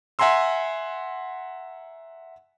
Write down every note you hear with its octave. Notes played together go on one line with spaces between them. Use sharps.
E5 F#5 G#5 A#5 C6 E6